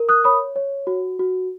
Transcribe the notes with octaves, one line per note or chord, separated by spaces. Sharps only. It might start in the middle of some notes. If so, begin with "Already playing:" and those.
Already playing: A#4
D#6 F#6
C#5 B5 D#6
C#5
F#4
F#4